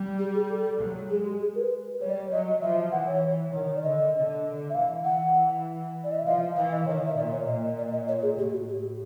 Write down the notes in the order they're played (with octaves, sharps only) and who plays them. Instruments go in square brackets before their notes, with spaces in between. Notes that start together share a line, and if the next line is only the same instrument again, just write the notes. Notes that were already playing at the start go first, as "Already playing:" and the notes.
Already playing: [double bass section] G3
[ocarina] G4
G#4
A4
[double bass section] F#3
[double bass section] G#3 [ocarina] G#4
[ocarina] G4
G#4
A#4
B4
[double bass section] G3 [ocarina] C#5
[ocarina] D5
C#5
[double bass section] F#3 [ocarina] D#5
[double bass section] F3 [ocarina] E5
[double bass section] E3 [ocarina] F#5
[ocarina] C#5
[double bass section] D#3 [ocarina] C#5
[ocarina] D5
[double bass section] D3 [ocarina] D#5
[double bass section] D3
D3
[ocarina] E5
[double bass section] E3 [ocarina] F5
[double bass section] E3 [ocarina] F#5
[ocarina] D5
D#5
E5
[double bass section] F3 [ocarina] F5
[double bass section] E3 [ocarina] F5
[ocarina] D#5
[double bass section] D#3 [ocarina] C#5
[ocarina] D#5
E5
[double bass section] A#2 [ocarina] D5
[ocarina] C#5
[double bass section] A#2 [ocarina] D#5
[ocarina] D5
D#5
C#5
G#4
[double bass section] A2 [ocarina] G4
[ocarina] F#4
[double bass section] A2 [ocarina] G4